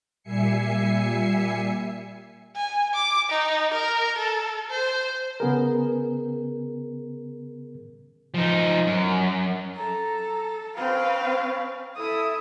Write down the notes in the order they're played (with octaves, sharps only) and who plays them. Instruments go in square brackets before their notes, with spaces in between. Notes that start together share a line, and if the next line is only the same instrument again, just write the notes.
[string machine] A#2 G3 E5 G#5 C7 C#7
[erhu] G#5
D6
D#4
A#4
A4
C5
[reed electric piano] C#3 B3 G#4 A#4
[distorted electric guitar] F3 D#4
F#2
[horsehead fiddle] A4 [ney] A#5
[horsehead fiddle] C4 B4 [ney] C#4 [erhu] F5
[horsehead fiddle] E4 E5 [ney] A4 [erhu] D#6